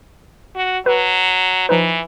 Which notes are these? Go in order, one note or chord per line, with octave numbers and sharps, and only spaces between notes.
F#4
F#3 B4
E3 F3 D#4 B4